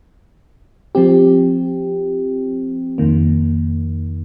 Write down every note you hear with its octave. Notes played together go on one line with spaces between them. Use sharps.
F3 C4 G4
F2 D#3 A#3